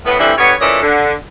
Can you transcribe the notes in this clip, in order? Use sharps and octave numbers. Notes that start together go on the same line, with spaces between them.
A2 B3
D3 E3 G3 A3 C4 E4
D3 G3 B3 C#5
A#2 E3 C#4 A4 D5 D#5
D3